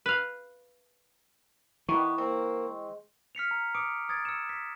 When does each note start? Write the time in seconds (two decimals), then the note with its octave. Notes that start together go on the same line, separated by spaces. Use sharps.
0.06 B4 F5
1.89 D#3 E3 G3 B3 C#6
2.18 A#3 C4 A#4 C5
2.66 G#3
3.35 F6 B6 C#7 F7
3.51 A#5
3.75 D6 D#6 C#7 D7
4.09 D#6 G#6 A6 D7
4.25 E6 C#7 E7
4.49 B6